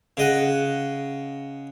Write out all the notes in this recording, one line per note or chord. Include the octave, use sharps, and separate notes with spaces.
C#3 D#5 F#5